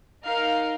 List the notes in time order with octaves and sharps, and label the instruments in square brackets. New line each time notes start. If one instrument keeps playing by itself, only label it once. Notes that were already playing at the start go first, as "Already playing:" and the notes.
[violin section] D#4 A#4 F5